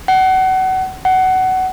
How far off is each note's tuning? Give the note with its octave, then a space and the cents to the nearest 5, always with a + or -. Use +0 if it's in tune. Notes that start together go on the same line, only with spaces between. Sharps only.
F#5 +30
F#5 +20